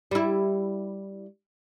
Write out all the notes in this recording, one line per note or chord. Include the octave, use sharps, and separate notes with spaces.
G3 E4